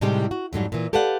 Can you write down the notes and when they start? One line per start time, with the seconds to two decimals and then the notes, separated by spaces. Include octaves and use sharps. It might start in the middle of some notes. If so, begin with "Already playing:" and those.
0.01 A2 C3 G3 G#3 D#4 G4
0.31 F#4
0.53 F2 G#2 F#3 G3
0.72 A#2 E3
0.93 G4 A4 B4 D5 F5 F#5